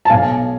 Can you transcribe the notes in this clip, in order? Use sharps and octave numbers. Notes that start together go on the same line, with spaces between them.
A5
B1 F5 G#5